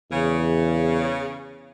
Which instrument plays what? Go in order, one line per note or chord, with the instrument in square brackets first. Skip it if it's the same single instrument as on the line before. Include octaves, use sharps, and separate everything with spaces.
[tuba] E2 [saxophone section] C#3